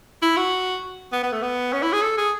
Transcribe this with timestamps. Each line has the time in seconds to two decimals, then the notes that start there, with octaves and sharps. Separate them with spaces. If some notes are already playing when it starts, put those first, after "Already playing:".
0.22 E4
0.37 F#4
1.12 B3
1.23 B3
1.32 A3
1.43 B3
1.73 C#4
1.83 E4
1.93 G#4
2.02 A4
2.18 G#4